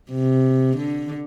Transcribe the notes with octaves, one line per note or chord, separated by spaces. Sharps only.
C3
D3